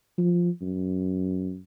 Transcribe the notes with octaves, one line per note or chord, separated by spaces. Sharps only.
F3
F#2